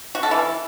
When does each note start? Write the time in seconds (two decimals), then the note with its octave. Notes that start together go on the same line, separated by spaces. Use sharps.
0.15 F#4
0.23 A4
0.31 E3